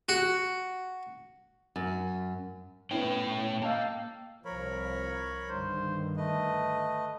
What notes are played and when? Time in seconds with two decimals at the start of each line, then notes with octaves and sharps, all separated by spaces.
0.09 F#4
1.76 F#2
2.91 A2 B3 C#4 E4 C#5 G5
3.62 A#3 A4 D#5 F5 G5 A5
4.45 C2 F3 A#4 C#5 B5
5.49 G2 D3 D#3 C5
6.17 A3 B4 D#5